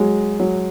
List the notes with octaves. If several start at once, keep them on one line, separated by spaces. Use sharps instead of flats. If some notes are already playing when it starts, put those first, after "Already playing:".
Already playing: F#3 G#3
F#3